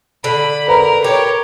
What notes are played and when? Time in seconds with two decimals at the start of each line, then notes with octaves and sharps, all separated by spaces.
0.24 D3 B5
0.68 A#4 B4 A#5 B5
1.04 G4 A#4 C#5